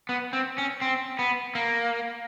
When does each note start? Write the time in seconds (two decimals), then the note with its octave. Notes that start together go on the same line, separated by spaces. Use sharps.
0.09 B3
0.33 C4
0.58 C#4
0.81 C4
1.19 B3
1.55 A#3